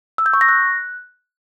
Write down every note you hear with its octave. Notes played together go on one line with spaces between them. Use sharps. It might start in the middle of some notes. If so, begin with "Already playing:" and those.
E6
G6
C#6
A#6
F#6